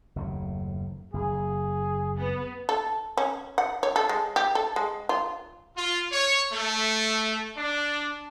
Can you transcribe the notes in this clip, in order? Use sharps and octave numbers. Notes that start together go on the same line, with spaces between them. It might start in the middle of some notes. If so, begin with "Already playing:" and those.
F#1 D#2 A2
F#1 G#4
B3
A4
C#4
F#5
C#5
A4
G#3
G4
A4
G#3
F4
F4
C#5
A3
D4